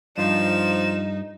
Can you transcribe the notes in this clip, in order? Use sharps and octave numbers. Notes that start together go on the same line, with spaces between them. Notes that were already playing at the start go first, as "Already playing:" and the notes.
G2 F3 D#4 E7